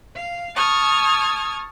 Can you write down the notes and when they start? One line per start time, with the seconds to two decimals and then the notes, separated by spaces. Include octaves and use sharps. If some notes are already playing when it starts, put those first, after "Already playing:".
0.16 F5
0.55 A5 C#6 D#6 F6 G#6